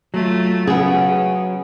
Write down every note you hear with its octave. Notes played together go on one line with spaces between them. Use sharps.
F#3 A3 F4
C#3 B3 G#4